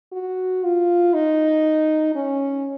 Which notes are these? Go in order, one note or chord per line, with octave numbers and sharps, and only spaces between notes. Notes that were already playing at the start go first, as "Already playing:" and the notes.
F#4
F4
D#4
C#4